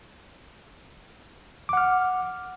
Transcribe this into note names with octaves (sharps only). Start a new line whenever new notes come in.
F#5 D6 F6